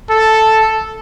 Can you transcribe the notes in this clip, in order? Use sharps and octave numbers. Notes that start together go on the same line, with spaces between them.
A4